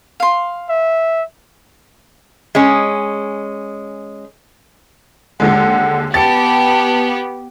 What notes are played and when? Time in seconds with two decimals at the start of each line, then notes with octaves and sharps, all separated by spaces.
0.20 F5 C6
0.69 E5
2.55 G#3 C#4
5.40 D#2 D3 G#3 F#5
6.14 B3 G4 A5 A6 C#7